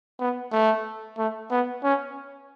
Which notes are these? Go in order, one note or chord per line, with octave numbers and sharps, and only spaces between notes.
B3
A3
A3
B3
C#4